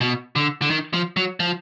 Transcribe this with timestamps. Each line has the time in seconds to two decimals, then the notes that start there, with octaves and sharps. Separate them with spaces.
0.01 B2
0.36 D3
0.62 D3
0.70 D#3
0.94 F3
1.17 F#3
1.40 F3